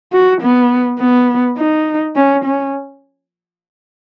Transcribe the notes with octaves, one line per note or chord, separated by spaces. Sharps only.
F#4
B3
B3
D#4
C#4
C#4